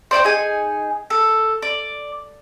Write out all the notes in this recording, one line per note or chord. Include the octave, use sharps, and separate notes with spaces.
C5 D5 D#5 G5
D#4 G#4 G#5
A4
D5